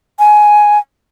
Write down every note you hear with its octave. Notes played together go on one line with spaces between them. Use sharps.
G#5